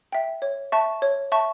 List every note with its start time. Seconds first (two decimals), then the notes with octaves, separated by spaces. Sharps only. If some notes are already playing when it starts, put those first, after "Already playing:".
0.12 E5 G5
0.42 C#5
0.72 E5 A5 C#6
1.02 C#5
1.32 E5 A5 C#6